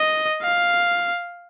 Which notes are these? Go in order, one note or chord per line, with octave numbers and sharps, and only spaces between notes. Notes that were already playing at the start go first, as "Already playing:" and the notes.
Already playing: D#5
F5